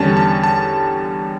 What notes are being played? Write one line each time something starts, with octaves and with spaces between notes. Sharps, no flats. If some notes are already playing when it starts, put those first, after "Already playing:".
Already playing: E2 D3 G3 C#4 A5
A5
A5